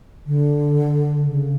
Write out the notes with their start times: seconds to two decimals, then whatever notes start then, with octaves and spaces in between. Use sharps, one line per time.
0.26 D3
1.25 C#3